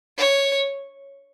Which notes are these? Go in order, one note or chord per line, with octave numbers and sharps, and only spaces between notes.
C#5